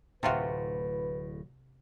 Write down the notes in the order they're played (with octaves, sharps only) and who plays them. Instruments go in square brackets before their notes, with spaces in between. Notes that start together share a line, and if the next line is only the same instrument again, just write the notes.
[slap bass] D1 A2 [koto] C3 F4 F#4 [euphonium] B4